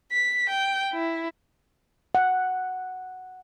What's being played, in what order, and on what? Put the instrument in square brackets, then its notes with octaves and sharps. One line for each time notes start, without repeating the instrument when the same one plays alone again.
[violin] B6
G5
E4
[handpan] F#5